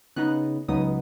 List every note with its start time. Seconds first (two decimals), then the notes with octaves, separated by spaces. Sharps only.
0.16 C#3 B3 D#4 F#6
0.68 C#2 C#3 F#3 B3 D#4 D#6